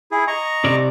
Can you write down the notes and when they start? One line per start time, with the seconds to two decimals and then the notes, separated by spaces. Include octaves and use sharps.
0.11 E4 G#4
0.28 D#5 A#5 C#6
0.64 C3 D5